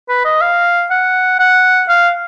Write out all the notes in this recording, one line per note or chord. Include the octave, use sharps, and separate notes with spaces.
B4
D#5
F5
F#5
F#5
F5